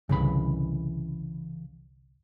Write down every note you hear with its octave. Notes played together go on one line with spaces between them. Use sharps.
G1 C2 C#3 E3 B5